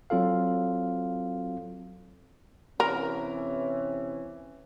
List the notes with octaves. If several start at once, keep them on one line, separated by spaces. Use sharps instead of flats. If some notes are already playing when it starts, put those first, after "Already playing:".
F#3 C4 F4 A4 F5
C3 E3 C#4 A#4